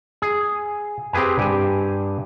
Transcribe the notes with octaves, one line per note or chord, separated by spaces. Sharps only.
G#4
C4 G4 G#4 B4 G#5
G2 G4 G#5